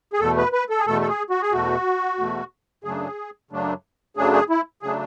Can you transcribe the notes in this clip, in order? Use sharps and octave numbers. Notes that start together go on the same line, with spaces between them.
G#4
E2 B2 A3 A4
B4
B4
A4
G#4
E2 B2 A3 A4
A4
G#4
F#4
G#4
E2 B2 A3 F#4
E2 B2 A3
F#2 C#3 F#3 A3 D4 G#4
F#2 C#3 F#3 A3 D4
F#2 C#3 F#3 A3 D4 G#4
G#4
E4
C#3 F#3 A3 D4 G#4